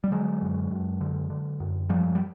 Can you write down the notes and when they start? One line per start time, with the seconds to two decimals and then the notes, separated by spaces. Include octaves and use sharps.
0.04 G3
0.12 D3 F#3 G#3
0.42 F#2
0.70 F#2
1.01 D3
1.30 D3
1.60 F#2
1.89 G#2 F3 G3
2.15 G3